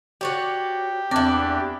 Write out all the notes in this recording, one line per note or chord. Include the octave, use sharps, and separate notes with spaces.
F#4 G4 C#5 D5
E2 C4 D4 E4 D5 D6